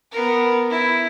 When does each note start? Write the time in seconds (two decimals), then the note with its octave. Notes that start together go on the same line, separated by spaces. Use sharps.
0.12 B3 A#4
0.70 E4